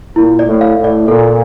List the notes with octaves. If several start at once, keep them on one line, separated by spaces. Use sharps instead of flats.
A#2 E4
D5
A2
F5
A2
D5
A#2 A4